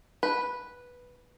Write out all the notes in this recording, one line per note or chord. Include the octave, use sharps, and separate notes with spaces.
B4